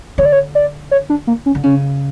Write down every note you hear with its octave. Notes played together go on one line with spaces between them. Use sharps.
D3 C#5
D5
C#5
D5
C#5
D4
A#3
C#4
D3
C#3 C#4